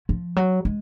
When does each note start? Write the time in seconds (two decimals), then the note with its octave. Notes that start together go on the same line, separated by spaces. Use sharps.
0.09 F3
0.36 F#3
0.65 G#3